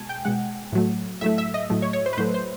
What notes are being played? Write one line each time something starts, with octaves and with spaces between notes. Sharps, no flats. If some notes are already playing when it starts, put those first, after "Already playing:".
Already playing: B2 G#3 G#5 A5
G5
B2 G#3 F#5
A2 F#3 A3
A2 F#3 A3 E5
E5
D#5
A2 F#3 A3
C#5
C#5
C5
B4
A2 F#3 A3 C5
C5